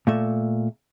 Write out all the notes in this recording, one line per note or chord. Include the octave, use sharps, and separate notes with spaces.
A#2 A3 E5